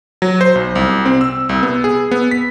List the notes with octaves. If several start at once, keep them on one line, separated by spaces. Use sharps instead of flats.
F#3
C5
B1
C2
C4
E6
C2
B3
G#4
B3
B6